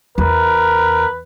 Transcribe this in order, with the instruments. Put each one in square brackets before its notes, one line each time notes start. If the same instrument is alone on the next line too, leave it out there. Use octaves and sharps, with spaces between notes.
[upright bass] E2 [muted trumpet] A#4 [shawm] B4